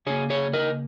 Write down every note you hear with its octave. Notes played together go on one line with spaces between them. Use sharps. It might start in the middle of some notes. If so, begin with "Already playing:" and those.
C#3 A#3 G#4 C#5
G#4 C#5
A#4 D#5